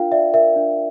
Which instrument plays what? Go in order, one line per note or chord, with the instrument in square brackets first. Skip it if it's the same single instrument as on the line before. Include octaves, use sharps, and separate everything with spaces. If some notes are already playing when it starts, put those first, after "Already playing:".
Already playing: [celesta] D4 F4 A#4 F5 G5
D5 E5
A#4 E5
D4